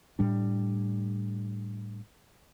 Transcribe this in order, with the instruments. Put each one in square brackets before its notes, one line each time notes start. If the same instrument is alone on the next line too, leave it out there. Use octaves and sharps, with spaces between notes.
[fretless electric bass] A2 G3 D4